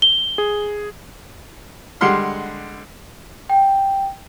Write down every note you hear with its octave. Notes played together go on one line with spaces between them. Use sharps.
G7
G#4
D3 G3 G#3 F#5 C6 F6
G5